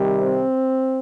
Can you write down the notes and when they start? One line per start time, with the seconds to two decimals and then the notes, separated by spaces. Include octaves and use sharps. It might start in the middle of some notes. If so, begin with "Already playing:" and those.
Already playing: C3 D#3 G3
0.20 C4